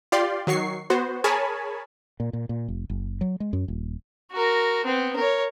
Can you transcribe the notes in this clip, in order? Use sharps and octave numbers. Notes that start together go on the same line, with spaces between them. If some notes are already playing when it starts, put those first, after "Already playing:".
F4 G4 D5 C6
D#3 F#3 C#6 C7
B3 F#4 C5
G#4 A#4 C#5 G#5 A5 B5
A#2
A#2
A#2
F1
F#1
F#3
G#3
F#2
D#1
F#4 A#4
B3 C4
A#4 C#5